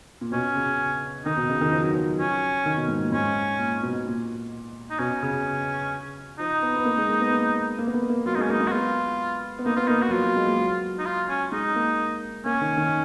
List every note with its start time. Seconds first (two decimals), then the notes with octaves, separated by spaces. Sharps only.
0.21 A#2
0.32 B2 C#4
0.55 C#3
1.25 D#3 D#4
1.37 B2
1.49 C#3
1.61 D#3
1.72 F3
1.83 F#3
1.94 F3
2.19 C#4
2.66 D#3
2.77 B2
2.88 G#2
3.00 A#2
3.12 G#2 C#4
3.59 A#2
3.82 B2
4.05 A#2
4.91 D#4
4.99 B2 C#4
5.22 C#3
6.39 F3 D#4
6.62 B3
6.76 B3
6.85 A#3
6.97 G#3
7.09 A#3
7.21 B3
7.33 A#3
7.79 A#3
7.87 B3
7.94 A#3
8.02 B3
8.09 A#3
8.25 F#3 F4
8.35 G#3 D#4
8.42 C#4
8.49 A#3 D#4
8.61 G#3
8.67 F#4
8.72 B3 F4
9.59 B3
9.66 A#3 D#4
9.76 B3 F4
9.87 A#3 D#4
10.02 F#4
10.08 F#3
10.12 F3 F4
10.23 F#3
10.36 G#3
10.47 A#3
10.59 F#3
10.99 D#4
11.06 F4
11.29 C#4
11.52 G#3 D#4
11.76 A#3
12.45 A#3 C#4
12.61 D#3
12.77 D#3